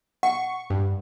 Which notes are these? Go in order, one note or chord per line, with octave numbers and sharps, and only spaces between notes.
F#5 C#6
G2